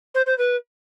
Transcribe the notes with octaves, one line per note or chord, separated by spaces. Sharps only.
C5
C5
B4